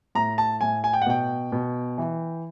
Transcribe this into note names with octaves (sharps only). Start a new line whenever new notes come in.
A2 A#5
A5
A2 G#5
G#5
G5
F#5
B2 G5
B2
E3